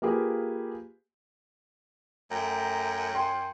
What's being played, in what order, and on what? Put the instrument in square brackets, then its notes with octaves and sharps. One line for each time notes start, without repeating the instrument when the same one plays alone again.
[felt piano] A#3 F4 G4 G#4 B4
[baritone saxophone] F#2 [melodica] A3 G5 A#5
[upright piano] G5 C6